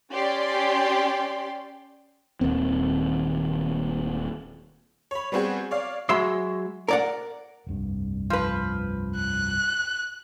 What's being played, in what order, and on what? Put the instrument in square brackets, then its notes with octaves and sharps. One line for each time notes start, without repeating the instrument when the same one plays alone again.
[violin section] C#4 G4 D5 C6
[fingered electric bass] D#1 D#2 A#3 C4
[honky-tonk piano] C#5 B5
G3 B3 C4 F#4 G#4
C#5 D5 F5
[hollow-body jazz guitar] F#3 G#3 E5 B5 C6
A#4 D5 F#5
[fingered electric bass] F1 C2 G2
[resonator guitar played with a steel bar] F3 B4
[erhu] F#6